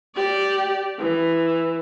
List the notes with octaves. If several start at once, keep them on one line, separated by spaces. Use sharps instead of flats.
G4 D5
E3